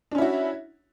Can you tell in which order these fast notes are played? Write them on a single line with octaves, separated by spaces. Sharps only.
D4 C#4 E4 F#4